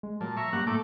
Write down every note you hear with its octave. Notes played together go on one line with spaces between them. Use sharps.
G#3
A#2 F#3 A5
E5 A#5 C#6
G2 A#3 F#5
A2 A3 A4 D6